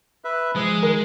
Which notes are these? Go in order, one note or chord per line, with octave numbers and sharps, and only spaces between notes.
B4 E5
F3 G#3 D#6
D#3 A#4